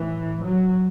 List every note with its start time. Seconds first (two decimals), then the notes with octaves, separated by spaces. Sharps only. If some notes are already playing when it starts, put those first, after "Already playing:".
Already playing: A2 E3
0.45 F#3